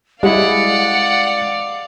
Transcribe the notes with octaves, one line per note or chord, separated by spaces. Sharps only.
G3 G#3 E4 D5 F5 F#5